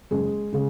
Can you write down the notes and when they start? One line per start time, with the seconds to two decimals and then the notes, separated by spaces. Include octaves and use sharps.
0.11 F#1 G#3 G#4
0.53 C#3 G#3 G#4